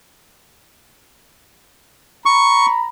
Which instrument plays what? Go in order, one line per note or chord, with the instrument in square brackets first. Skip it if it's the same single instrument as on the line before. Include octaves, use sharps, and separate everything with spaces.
[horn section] A#5 B5 [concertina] C#6